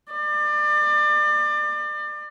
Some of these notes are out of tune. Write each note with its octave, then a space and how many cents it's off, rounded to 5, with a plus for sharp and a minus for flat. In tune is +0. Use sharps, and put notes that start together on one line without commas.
D5 +30